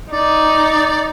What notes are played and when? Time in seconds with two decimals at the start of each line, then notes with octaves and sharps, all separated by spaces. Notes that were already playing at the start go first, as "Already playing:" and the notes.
0.13 D#4 D5